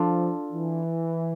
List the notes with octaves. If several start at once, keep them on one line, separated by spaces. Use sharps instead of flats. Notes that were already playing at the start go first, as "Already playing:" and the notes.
Already playing: F3 D4 F4 A4
E3